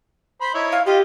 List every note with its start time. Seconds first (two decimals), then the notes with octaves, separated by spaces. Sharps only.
0.41 C5 B5
0.54 D#4 E4 C#5
0.72 F5
0.86 F4 G4 D#5